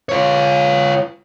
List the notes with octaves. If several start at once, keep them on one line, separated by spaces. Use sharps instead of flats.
F4 C#5